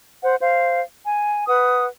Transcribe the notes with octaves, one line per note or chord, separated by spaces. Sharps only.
C5 F#5
C5 F5
G#5
B4 F#5 D#6